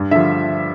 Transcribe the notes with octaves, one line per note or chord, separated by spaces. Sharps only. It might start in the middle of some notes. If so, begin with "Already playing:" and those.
Already playing: G2
D3 F3 E5